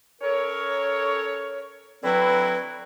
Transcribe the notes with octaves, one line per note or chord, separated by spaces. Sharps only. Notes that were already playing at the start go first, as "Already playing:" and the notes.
C#4 A4 A#4 C#5
D3 F#3 C4 E4 F#4 B4